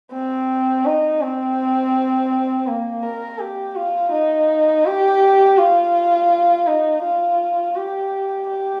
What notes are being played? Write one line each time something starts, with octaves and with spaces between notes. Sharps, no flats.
C4
D#4
C4
A#3
A#4
G4
F4
D#4
G4
F4
D#4
F4
G4
G4